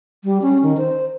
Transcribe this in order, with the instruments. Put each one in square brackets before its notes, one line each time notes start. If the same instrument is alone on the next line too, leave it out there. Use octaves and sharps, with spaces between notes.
[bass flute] G3
C#4
D#3
C5